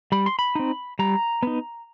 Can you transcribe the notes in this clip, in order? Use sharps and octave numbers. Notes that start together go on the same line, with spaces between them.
G3 B5
C6
B5
C4 D#4
G3 A#5
B3 D#4